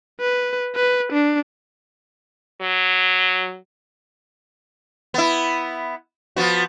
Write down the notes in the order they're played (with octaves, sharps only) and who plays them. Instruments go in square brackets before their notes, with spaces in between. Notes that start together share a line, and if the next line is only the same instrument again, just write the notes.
[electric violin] B4
B4
D4
[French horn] F#3
[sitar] B3 E4
F3 B3 F#4